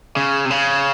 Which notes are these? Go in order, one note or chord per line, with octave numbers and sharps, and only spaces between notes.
C#3
C3
C#3